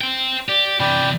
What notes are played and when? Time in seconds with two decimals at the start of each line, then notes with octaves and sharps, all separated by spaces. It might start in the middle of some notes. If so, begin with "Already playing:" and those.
0.01 C5 G5
0.49 G4 D5
0.80 C3 E3 D5 G5 B5